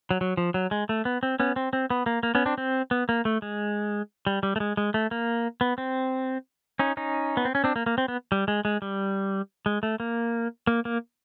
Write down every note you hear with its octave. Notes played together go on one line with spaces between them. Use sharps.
F#3
F#3
F3
F#3
G#3
A3
B3
C4
B3 C#4
C4
C4
B3
A#3
A#3
B3 C#4
C4 D4
C4
B3
A#3
A3
G#3
G3
G3
A3
G#3
G#3
A3
A#3
B3
C4
C#4 D#4
C#4 D#4
B3
C4
C#4
C4 D4
A#3
A#3
C4
B3
G3
G#3
G#3
G3
G#3
A3
A#3
A#3
A#3